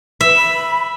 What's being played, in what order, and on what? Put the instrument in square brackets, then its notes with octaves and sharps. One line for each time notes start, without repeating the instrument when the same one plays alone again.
[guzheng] E5
[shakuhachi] B5